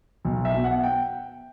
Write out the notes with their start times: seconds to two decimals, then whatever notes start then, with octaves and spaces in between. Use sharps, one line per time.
0.25 B1
0.45 E5
0.54 B2
0.64 F#5
0.84 G5